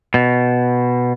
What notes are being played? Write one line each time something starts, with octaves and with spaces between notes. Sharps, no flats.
B2